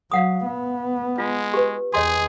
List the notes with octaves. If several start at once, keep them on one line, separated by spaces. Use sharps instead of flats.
F#3 F5 F#5 D#6
B3
G#3 F4
G4 B4
E2 G#4 C#5 D#5 C6